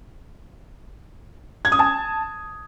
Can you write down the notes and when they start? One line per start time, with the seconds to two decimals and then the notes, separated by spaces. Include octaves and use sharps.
1.65 G#6
1.72 D#6
1.79 A5